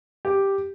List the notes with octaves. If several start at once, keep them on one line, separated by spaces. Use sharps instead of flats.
G4